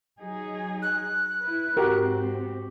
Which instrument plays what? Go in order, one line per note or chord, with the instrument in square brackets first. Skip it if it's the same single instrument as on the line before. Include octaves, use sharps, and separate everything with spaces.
[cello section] F#3 D#4 G#4
[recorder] F#6
[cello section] E4 B4
[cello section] G#2 C4 [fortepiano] F#4 G4 [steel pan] A#4